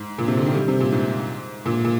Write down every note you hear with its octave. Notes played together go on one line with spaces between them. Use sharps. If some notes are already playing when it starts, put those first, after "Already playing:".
Already playing: G#2
A#2
C3
D3
D#3
G3
C3
A#2
G#2
A#2
A#2